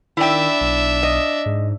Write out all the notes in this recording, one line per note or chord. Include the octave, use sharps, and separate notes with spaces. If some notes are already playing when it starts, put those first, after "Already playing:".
D#3 D4 E4 E5 G5
B1
D#5
G#2